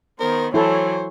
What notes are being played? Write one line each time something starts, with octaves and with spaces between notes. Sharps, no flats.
D#3 B3 A#4 C5
E3 F#3 E4 A4 C5 C#5